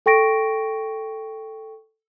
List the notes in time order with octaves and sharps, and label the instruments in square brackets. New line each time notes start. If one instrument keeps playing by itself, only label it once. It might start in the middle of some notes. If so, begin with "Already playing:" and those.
[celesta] A4 G5 C#6 A#6 D7